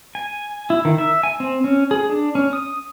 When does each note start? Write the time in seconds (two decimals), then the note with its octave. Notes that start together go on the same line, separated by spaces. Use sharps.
0.15 G#5
0.70 E4
0.85 D#3
0.98 E5
1.23 G#5
1.40 C4
1.64 C#4
1.91 G#4
2.10 D4
2.35 C#4
2.53 D#6